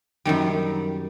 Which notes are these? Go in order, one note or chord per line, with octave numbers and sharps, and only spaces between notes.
F#2 D#3 G3